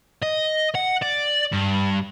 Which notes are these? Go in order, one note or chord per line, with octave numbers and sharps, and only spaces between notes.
D#5
F#5
D5
G2